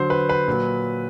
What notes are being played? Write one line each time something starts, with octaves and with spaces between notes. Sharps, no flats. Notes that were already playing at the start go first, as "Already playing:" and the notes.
Already playing: D3 F#3 C5
B4
B4
A#2 F#3